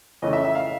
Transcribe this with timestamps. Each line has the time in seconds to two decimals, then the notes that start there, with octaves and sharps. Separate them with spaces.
0.22 F2 C#3 E3 A3 C#4 D#5
0.33 E5
0.45 E5
0.55 F5